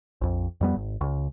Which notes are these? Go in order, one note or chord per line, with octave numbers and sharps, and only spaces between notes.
A#1 F2
F2 G3 B3
G#1
C#2